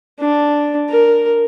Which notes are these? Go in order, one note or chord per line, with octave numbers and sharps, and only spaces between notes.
D4
A#4